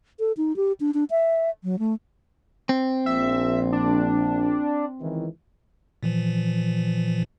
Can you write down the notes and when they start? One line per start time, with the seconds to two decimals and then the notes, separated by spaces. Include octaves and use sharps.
0.19 A4
0.37 D#4
0.56 G4
0.80 D4
0.94 D4
1.11 E5
1.64 F#3
1.79 A3
2.69 C4
3.06 A#1 E5
3.73 D4
5.00 C#2 D#3 E3
6.03 A#2 E3 F3